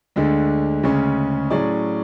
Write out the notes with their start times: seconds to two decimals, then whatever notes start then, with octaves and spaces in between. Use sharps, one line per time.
0.16 D2 D3 G#3 D4
0.83 D2 C#3 G#3 C#4
1.50 A2 F#3 C#4 G#4 D5